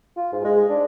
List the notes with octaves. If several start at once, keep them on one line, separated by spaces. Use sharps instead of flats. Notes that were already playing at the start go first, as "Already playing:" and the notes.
F4
G#2
G#3
D4